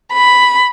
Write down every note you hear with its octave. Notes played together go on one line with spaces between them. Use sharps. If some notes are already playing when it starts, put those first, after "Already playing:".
B5